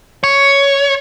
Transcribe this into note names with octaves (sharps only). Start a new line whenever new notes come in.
C#5